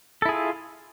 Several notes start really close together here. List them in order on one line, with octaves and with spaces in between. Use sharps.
A4 E4 G#4 F4